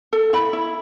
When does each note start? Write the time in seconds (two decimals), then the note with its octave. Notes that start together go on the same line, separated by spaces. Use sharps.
0.13 A4
0.33 E4 B5
0.53 E4